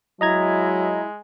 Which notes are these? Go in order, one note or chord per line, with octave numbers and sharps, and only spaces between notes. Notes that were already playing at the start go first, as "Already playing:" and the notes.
F#3 G#3 E4 D#5 A#5 G#6